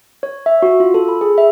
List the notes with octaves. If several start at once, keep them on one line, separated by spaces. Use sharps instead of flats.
C#5
E5
F#4
F4
A4
B5
G#4
E5